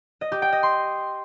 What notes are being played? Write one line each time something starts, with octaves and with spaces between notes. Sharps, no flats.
D#5
G4
G5
D#5
C6